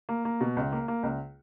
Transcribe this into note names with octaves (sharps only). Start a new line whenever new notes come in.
A#3
A#3
B2
C#2
A#3
A#3
C#2